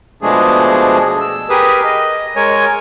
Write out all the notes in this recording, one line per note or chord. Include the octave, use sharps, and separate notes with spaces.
B2 F3 G#3 A3 D4 G#4
E6
G4 G#4 A#4 B4 D#6
D#5
G#3 A#4 C#5 G#5